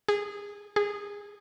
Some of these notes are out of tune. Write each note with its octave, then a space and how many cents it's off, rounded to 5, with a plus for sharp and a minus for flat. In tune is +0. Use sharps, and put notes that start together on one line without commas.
G#4 -20
G#4 -20